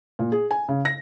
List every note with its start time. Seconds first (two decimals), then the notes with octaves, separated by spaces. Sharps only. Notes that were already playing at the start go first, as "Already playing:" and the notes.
0.19 A#2
0.32 G#4
0.51 G#5
0.69 C#3
0.85 A#6